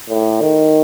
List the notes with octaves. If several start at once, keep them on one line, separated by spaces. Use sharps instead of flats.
A2
D#3